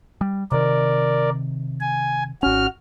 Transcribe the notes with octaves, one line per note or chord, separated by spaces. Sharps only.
G3
C3 D#3 A#4 D5
G#5
G#1 C#4 F#4 F6